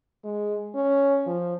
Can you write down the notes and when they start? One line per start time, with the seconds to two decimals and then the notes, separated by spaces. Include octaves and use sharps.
0.24 G#3
0.75 C#4
1.26 F3